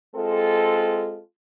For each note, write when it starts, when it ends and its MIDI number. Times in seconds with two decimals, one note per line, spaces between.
0.15 1.19 56
0.15 1.19 60
0.15 1.19 65
0.15 1.19 69